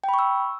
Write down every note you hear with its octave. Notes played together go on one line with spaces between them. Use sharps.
G5
B5
C#6
E6